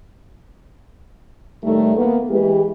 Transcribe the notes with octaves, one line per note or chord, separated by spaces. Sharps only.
A2 D#3 G3 A3
A#3 B3
E3 G#3 G4